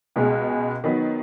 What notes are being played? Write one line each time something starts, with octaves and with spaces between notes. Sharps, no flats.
C#2 B2 G#3
D#3 F#3 B3